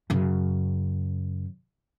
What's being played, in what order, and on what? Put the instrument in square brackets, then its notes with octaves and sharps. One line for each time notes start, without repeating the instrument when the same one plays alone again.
[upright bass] F#2 C#3